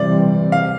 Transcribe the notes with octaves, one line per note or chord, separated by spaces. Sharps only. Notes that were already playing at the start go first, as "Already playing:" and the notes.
Already playing: C3 E3 G3 C4 D5
F5